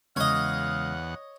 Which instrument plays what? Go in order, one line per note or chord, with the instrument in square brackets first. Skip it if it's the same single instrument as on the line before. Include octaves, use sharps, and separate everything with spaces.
[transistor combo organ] E2 F#5 [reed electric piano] C#3 G#3 [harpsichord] C#5 D#5 [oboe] F5